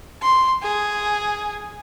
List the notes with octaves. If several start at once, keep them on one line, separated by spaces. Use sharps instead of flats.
C6
G#4